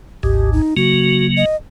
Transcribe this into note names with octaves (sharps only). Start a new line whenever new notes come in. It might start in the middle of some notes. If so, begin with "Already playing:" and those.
G#1 D2 G#2 G4
D#4
C#3 F#3 A#3 F#4
D#5